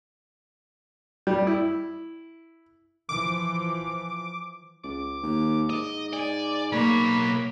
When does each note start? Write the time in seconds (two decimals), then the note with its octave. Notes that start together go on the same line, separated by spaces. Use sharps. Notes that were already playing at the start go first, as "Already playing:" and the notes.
1.27 G3
1.47 E4
3.09 E3 F3 D6
4.84 C#2 D6
5.23 D#2
5.70 G#2 D#5
6.13 D5 G#5
6.72 B1 A#3 C#5 B5